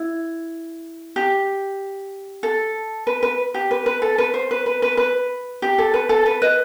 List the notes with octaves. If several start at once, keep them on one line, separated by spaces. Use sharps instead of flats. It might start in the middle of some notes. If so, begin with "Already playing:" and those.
Already playing: E4
G4
A4
B4
B4
G4
B4
B4
A4
B4
C5
B4
B4
B4
B4
G4
A4
B4
A4
B4
B4 D#5